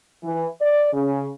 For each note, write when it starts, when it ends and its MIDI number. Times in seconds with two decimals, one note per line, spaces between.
0.23 0.46 52
0.60 0.89 74
0.93 1.27 49